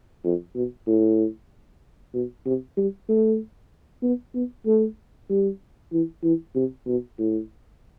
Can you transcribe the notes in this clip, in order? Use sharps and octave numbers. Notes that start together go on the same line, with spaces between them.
F2
B2
A2
B2
C3
G3
A3
B3
B3
A3
G3
E3
E3
C3
B2
A2